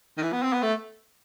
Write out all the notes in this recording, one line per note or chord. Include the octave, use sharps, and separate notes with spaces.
D#3
E3
B3
C4
B3
A3